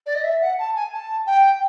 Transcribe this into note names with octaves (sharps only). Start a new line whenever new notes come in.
D5
D#5
E5
F#5
A5
G#5
A5
G5